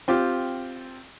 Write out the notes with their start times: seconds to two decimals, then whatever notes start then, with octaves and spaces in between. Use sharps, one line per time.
0.08 C4 F4 G4